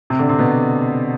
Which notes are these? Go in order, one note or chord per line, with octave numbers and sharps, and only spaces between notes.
C3 C4
D3 D4
C3 C4
B2 B3